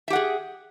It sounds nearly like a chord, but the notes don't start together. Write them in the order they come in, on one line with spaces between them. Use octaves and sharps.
E5 G4 F#5 G#4